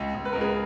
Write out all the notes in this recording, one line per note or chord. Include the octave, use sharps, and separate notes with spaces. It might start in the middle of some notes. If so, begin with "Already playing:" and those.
Already playing: C#2
C#2
B4
C#2 A#4
G#4 B4